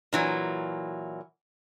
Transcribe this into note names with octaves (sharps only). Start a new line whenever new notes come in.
A#2 E3 F#3